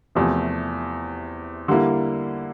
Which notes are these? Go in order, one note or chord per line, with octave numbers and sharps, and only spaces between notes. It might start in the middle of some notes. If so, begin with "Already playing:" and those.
E2 C3 F3 A3
D3 G3 A#3 E4